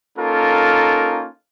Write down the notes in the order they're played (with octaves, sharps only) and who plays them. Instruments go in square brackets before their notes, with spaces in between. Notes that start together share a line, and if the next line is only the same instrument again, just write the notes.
[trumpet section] A#3 C#4 D#4 F4 A4 A#4